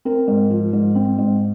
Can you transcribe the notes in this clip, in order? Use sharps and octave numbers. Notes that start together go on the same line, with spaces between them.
C4 A#4
G#2
F3
G#2
C4
G#2